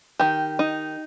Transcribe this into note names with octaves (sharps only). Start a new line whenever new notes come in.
D#3 G4
D#4